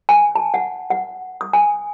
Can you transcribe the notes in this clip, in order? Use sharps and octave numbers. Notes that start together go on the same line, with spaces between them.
G#5
A5
F#5
F#5
D#6
G#5